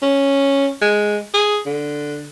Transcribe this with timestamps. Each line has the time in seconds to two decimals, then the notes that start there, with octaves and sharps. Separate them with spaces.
0.02 C#4
0.81 G#3
1.34 G#4
1.66 D3